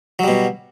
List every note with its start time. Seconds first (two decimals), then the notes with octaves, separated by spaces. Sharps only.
0.19 F#3
0.24 G3
0.28 B2